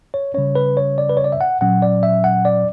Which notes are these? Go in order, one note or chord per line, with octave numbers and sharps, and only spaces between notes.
C#5
C#3 G3 C#4 C#5
B4
C#5
D5
B4
C#5
D5
E5
F#5
A#2 F#3 C#4 F#5
D5
E5
F#5
D5